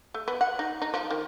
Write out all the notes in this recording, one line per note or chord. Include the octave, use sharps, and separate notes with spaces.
A3
B3
F#5
D#4
D#4
F3
D#3